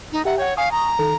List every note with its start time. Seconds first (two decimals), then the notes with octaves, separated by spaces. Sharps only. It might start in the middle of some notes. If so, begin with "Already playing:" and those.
0.12 D#4
0.25 G4 E5 F#5 A#5
0.38 C#5 F#5 G5
0.57 F5 G#5 C#6 D#6
0.72 A#5
0.99 D#3 A4